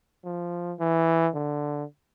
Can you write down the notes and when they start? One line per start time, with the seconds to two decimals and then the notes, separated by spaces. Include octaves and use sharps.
0.24 F3
0.80 E3
1.35 D3